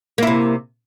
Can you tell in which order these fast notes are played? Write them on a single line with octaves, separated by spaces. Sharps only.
A#3 E4 C3